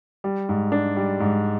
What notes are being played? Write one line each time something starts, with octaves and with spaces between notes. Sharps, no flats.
G3
G#2
D4
G3
G#2